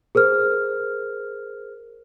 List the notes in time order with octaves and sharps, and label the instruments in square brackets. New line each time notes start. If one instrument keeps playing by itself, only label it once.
[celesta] G#4 A#4 C5 F6